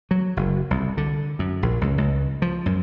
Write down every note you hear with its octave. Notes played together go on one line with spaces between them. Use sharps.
F#3
F#1
C2
D3
F#2
A#1
C#2
C#2
F3
F#2